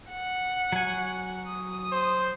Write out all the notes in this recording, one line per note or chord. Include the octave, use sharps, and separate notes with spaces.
F#5
F#3 G#5
D#6
C5